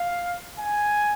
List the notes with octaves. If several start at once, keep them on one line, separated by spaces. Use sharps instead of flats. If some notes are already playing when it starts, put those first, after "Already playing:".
Already playing: F5
G#5